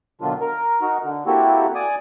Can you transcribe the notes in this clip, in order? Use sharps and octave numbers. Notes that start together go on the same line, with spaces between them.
B2 D3 D#3 F#3 D4 F4
A#4
D#4 F#4 A#4
D3
A#3 C4 E4 F#4 G4 A4
D5 G#5 D6 D#6